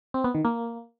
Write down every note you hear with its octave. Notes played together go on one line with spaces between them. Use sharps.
C4
B3
D#3
A#3